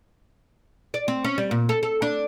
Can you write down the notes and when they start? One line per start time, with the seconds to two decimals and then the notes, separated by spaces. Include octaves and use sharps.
0.94 D5
1.08 C4
1.25 C#4
1.38 G3
1.51 A#2
1.69 A4
1.83 A4
2.02 D4